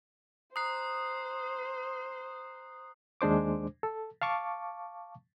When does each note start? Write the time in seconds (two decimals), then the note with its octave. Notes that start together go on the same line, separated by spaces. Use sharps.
0.56 C5 A#5 D#6 F#6 C7
3.21 D#2 G#3 D4 C5 D6
3.83 A4
4.22 F5 A5 C#6 D6